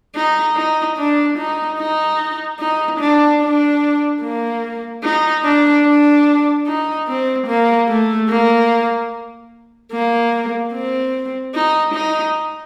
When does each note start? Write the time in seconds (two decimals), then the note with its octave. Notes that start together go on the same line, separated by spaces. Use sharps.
0.16 D#4
0.56 D#4
0.98 D4
1.38 D#4
1.79 D#4
2.60 D#4
3.00 D4
3.42 D4
4.22 A#3
5.03 D#4
5.44 D4
5.85 D4
6.67 D#4
7.08 C4
7.47 A#3
7.88 A3
8.29 A#3
9.92 A#3
10.73 C4
11.54 D#4
11.94 D#4